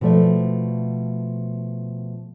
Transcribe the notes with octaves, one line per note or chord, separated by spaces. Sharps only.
B2 F3 A3 D5 E5